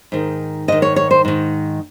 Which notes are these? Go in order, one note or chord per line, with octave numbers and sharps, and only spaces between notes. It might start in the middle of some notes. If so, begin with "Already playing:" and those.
G#2 D#3
G#2 D#3 D#5
C#5
C#5
C5
G#2 D#3